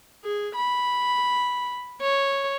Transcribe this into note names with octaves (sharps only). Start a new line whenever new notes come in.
G#4
B5
C#5